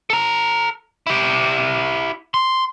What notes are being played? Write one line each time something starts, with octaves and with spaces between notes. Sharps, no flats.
A4 A#5
E4 G4
C6